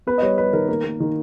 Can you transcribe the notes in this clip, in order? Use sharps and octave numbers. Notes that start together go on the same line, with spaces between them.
B3 B4
D#5
G3 C#5
G3 B4
D#3 A#4
A#3
A#3
D#3